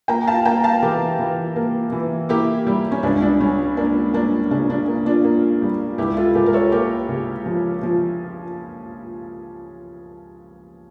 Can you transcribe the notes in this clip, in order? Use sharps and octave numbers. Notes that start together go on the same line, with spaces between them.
A#3 G5 A#5
F5 A5
A#3 G5 A#5
F5 A5
E3 G4 A#4
E3
A#3
E3
A#3 E4 G4
G3
C#4
C#2 D4
D4
G3 C#4
A#3 D4
A#3 D4
C#3 D4
D4
A#3
D4 F4
A#3
G3
C#2 E4 G4
F4 A4
C#2 G4 A#4
A#4
A4 C#5
A#3 G4 A#4
C#3
F3
F3